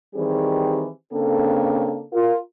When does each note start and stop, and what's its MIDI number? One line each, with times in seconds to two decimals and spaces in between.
0.15 0.88 51
0.15 0.88 52
0.15 0.88 55
0.15 0.88 60
0.15 0.88 67
0.15 0.88 68
1.13 2.03 49
1.13 2.03 58
1.13 2.03 60
1.13 2.03 62
1.13 2.03 69
2.13 2.36 65
2.13 2.36 70